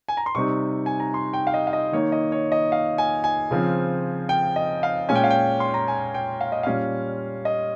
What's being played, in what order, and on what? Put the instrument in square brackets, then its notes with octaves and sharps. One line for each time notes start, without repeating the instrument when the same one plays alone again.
[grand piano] G#5
A#5
C6
C3 G3 C4 D#4 C#6
G#5
A#5
C6
G5
F5
D#5
F5
D#5
D#3 A#3 D#4 C#5
D#5
C#5
D#5
F5
G#5
G#5
C#3 F3 C4
G5
D#5
F5
A#2 G#3 C#4 G#5
G5
F5
G5
C6
A#5
G#5
G5
F5
D#5
A#2 G3 C#4 F5
D#5